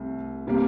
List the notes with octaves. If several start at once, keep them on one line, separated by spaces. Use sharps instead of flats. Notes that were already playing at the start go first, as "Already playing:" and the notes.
Already playing: C2 C3 A3
C3 G3 A#3